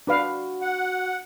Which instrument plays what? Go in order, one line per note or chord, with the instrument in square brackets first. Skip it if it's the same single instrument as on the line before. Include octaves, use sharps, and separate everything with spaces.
[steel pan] D4 B4 F5 [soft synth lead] F#4
[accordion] F#5